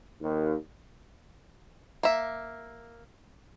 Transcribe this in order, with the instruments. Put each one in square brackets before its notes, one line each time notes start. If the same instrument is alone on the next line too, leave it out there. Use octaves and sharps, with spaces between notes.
[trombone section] D#2
[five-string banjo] A#3 E5